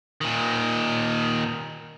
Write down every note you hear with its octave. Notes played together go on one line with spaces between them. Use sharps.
A#2 D#3